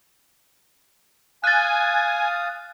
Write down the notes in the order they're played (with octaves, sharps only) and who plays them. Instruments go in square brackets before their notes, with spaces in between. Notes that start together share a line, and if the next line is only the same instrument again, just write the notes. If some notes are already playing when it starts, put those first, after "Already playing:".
[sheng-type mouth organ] F5 D#6 [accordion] G#5 [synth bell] F#6 A6